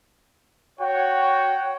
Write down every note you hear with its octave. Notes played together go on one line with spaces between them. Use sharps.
F#4 C#5 G5